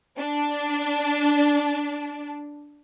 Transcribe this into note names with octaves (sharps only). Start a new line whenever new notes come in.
D4 A5